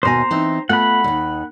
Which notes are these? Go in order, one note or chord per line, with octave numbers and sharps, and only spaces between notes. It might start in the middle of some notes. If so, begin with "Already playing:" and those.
D#2 B2 C5 G#5 A#5
E3 C4 D#4
A3 B3 F4 F#5 B5
D#2 D#3